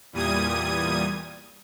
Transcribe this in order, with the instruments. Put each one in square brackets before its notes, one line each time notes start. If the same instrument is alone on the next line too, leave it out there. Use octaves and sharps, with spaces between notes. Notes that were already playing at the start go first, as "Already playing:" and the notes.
[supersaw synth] E2 A#2 G3 D#6 G#6 D#7